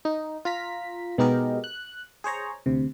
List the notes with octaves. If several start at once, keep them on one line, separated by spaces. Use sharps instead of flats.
D#4
F4 A#5 B6
B2 G#3 B3 D#4 G4 A#4
F#6
G#4 C5 C#5 A#5
D2 C3